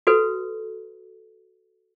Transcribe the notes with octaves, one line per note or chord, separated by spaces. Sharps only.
F#4 A4 B4